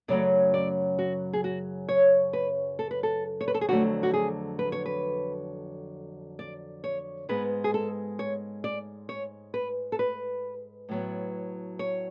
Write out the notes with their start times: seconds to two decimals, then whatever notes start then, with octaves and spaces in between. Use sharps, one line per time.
0.08 F#2 C#3 F#3 A3 D5
0.54 D5
0.99 F#4
1.33 G#4
1.44 F#4
1.89 C#5
2.33 B4
2.79 A4
2.91 B4
3.03 A4
3.41 C#5
3.48 B4
3.54 A4
3.61 G#4
3.69 F2 D3 F#3 A3 F#4
4.03 F#4
4.14 G#4
4.59 B4
4.72 C#5
4.86 B4
6.39 D5
6.84 C#5
7.29 G#2 G#3 B3 B4
7.64 G#4
7.74 A4
8.19 C#5
8.64 D5
9.09 C#5
9.54 B4
9.92 A4
9.99 B4
10.89 A2 F#3 B3
11.79 C#5